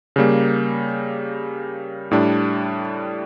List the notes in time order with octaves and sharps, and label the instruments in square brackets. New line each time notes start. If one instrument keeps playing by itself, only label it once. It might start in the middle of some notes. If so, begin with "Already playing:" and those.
[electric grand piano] C#3 G3 A#3
A2 G3 D4